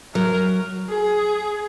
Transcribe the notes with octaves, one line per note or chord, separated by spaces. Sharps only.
F#3 A#4
G#4